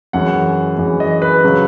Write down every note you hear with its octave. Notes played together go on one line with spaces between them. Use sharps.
F#2 E3 G#3 F#5
F#2 E3 G#3
D#5
B4
C#3 F#3